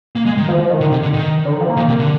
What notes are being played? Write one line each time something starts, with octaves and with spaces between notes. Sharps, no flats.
A#3
G#3
D#3
F3
F3
D#3
D3
C3
D3
D#3
D3
D#3
F3
A#3
D#3
C3
D3